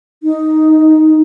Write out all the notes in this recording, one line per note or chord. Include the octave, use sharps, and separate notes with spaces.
D#4